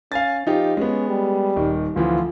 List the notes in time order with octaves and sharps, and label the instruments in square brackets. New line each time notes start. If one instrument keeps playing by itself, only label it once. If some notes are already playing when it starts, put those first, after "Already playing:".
[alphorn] C#4 [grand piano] F5 G#5 A6
[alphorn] F3 [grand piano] D#4 F4 G4
[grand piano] G#3 B3 [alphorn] C#4
[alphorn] G3
[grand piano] D#1 D#3
[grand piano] D2 E3 F3 [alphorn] F4